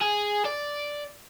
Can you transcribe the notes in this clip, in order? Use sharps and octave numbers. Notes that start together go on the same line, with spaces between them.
G#4
D5